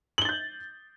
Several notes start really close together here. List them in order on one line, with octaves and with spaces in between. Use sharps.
F#7 G7 A6 G6